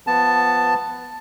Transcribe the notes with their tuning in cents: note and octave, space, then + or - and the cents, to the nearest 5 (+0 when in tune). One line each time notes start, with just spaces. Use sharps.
F3 +0 B3 +0 A5 +5